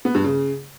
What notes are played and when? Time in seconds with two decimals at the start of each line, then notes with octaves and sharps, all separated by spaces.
0.05 B3
0.15 G2
0.24 C#3